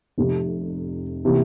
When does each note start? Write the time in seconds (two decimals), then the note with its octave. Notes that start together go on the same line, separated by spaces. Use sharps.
0.18 F1 F2 C3
1.25 C3 E3 A#3